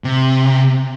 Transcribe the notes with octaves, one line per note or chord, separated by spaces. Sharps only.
C3